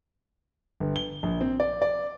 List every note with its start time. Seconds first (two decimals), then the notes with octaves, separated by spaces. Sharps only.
0.80 G1
0.96 G7
1.23 A#1
1.41 C4
1.60 D5
1.82 D5